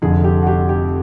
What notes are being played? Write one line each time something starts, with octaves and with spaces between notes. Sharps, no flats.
F1 F2 D3 G#4
G4
F#4
G4
G4